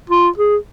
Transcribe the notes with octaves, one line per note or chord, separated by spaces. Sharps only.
F4
G#4